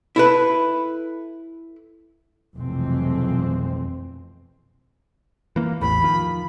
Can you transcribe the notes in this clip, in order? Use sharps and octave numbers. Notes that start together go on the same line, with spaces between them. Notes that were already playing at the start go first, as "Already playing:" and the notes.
E4 A4 B4
F1 B1 F2 E3 G#3 C4
E3 A#3
A1 E2 A2 B5
D#3 F3